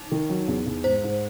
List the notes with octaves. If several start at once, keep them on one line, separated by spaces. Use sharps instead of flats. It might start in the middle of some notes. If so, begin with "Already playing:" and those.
Already playing: D#4
D#3
F#3
E2
E2
G#2 C5
G#2